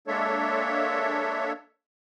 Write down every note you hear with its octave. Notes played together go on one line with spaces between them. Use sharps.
G#3 A#3 D4 A4 C#5 E5